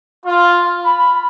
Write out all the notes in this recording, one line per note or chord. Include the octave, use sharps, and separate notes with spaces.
F4
B5